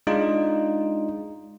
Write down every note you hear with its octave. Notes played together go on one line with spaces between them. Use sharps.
G#3 D4 D#4 F4